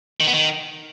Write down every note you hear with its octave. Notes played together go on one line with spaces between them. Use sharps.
D#3
B3
D#3